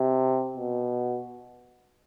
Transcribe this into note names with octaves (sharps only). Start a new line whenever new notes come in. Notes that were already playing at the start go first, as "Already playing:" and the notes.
Already playing: C3
B2